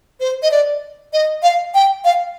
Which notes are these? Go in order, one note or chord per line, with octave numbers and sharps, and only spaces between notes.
C5
D#5
D5
D#5
F5
G5
F5